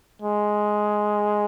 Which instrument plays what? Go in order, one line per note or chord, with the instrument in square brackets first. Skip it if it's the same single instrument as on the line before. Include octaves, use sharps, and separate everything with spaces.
[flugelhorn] G#3